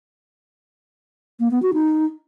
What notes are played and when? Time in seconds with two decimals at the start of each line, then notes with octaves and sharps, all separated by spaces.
1.40 A#3
1.51 B3
1.62 F#4
1.74 D#4